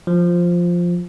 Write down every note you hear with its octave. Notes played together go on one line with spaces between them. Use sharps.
F3